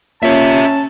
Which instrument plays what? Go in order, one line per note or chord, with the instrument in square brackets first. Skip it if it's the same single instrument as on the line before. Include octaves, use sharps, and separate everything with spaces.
[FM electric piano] A#3 F4 C#5 [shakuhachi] C#4 [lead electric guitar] G4 E5 [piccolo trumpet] A5